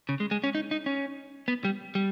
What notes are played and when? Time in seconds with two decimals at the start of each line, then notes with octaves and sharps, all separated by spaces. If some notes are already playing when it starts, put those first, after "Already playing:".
0.09 C#3
0.20 G#3
0.31 G#3
0.44 C#4
0.55 D#4
0.71 D#4
0.86 C#4
1.48 B3
1.65 G3
1.95 G3